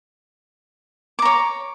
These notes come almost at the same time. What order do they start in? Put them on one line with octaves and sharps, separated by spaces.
D6 A#5 C#5